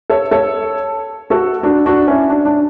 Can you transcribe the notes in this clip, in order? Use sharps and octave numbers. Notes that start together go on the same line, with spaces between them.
A4 C#5
A4 C#5
F#4 A4
D4 F#4
D4 F#4
C#4 E4
D4
D4